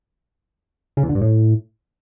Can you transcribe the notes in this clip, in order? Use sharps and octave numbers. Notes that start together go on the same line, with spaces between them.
C#3
E2
D3
G2
A2